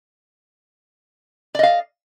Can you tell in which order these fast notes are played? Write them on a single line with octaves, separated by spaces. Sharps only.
D5 D#5 F5